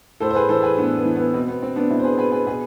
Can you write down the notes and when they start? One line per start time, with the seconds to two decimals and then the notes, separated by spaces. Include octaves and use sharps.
0.20 A2 A4 C5
0.30 C5
0.34 G#4 B4
0.49 E3 A4 C5
0.63 G#4 B4
0.77 A2 B3 D4
0.96 B3
1.05 E3
1.16 B3
1.33 B2 C4
1.48 B3
1.62 C4
1.76 B3 D4
1.89 B2 C4 E4
1.99 C5
2.04 G#4 B4
2.18 G#4 B4
2.32 G#4 B4
2.46 B2 G#4 B4